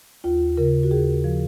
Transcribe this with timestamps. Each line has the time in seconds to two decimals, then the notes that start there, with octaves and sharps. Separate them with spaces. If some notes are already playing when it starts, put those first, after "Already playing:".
0.24 D#2 F4
0.57 C#3 A#4
0.83 F#4
0.91 D#2 G#4
1.24 F3